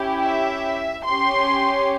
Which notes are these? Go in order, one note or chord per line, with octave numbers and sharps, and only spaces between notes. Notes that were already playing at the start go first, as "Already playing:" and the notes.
Already playing: C#4 E4 G4
E5
C#4 G4 C6